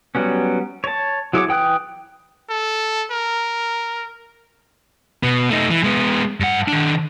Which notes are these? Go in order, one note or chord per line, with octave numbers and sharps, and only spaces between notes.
F#3 G3 B3 C#4
C#5 A5
F#3 E4 G#4 C#5 D6
E3 G5 D#6 F#6
A4
A#4
B2 B3
A3 D#4
E3
G#3 B3
G2 F#5
D#3 D4